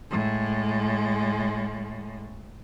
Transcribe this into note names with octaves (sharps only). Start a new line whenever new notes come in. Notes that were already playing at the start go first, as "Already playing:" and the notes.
A2 G#3